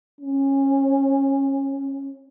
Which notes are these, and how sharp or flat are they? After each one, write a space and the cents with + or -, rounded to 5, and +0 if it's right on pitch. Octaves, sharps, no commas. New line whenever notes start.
C#4 -20